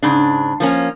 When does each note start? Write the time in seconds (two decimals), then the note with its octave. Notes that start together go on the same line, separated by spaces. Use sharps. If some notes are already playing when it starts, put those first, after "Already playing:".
0.02 G#2 C#3 D4
0.60 F3 A#3 C#4